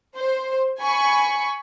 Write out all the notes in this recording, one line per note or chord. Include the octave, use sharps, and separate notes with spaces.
C5
G#5 B5 C#6